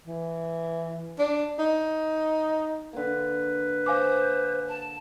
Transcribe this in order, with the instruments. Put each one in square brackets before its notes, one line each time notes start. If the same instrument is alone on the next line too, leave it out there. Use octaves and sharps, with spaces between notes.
[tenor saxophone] E3
D4
D#4
[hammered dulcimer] D3 A#3 [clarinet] B4
[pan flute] C5 [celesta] F5 G#5 D6
[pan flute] A5